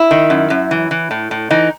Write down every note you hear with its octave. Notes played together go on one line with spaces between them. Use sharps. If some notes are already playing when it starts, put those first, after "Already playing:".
Already playing: E4
D#3
F#2
F#2
E3
E3
A2
A2
E3 D#4